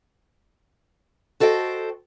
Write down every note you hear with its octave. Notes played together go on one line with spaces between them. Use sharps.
F#4 A4 C5 D#5 G5